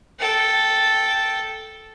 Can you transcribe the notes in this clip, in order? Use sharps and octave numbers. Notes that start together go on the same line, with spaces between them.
A4 G5